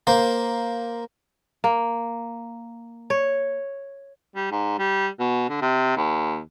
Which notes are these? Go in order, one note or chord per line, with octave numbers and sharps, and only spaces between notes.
A#3 C5
A#3
C#5
G3
G#2
G3
B2
D3
C3
D#2